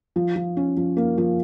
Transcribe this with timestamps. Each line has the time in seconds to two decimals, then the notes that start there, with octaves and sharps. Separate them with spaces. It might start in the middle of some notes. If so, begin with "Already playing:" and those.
0.16 F3
0.36 F3
0.57 C#4
0.77 F3
0.97 A#3
1.18 F3